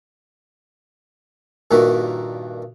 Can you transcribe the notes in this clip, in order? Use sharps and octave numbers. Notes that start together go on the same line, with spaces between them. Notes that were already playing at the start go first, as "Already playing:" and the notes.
G2 A#2 D#3 A#3 E4 F#4